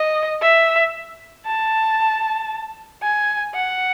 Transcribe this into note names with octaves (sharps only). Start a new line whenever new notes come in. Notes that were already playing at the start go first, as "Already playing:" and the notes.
Already playing: D#5
E5
A5
G#5
F#5